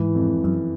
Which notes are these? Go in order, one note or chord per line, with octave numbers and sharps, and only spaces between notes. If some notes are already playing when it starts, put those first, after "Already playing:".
Already playing: G#2 E3
F2
F#2